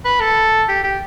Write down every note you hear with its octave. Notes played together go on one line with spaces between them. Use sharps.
B4
A4
G4
G4